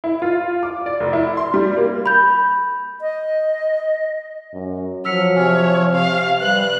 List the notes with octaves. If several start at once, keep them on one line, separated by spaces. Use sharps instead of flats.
E4
F4
D6
D5
F1
E4
C6
G3
A#3
B5 G6
D#5
F#2
F3 F#3 E6 F6 B6 C#7
C3 C#5 G#5 F6
C3 F5
G3 B4 F#6 F#7